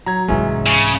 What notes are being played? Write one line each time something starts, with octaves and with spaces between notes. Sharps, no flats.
F#3 A#5 G#6
C2 G#2 E3 G#3 C#4
C#3